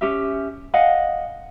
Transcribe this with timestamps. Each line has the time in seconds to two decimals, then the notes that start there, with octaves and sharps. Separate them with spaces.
0.01 C#4 G4 E5
0.74 D#5 F5 F#5 G#5